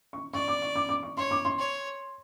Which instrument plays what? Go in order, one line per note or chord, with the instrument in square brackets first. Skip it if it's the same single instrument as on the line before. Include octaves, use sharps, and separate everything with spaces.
[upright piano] C#6
[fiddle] D5 [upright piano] C#6
[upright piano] D6
C#6
D6
D6
C#6
[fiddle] C#5 [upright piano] C6
[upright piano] D6
C6
[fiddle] C#5